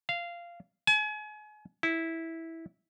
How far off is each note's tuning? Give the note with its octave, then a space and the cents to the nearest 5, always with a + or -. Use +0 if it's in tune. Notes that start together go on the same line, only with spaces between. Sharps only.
F5 -15
G#5 +35
E4 -10